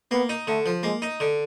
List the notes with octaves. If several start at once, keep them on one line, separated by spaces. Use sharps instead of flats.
A#3 B3
D#4
D3 A3
F3
G#3 A#3
D#4
D3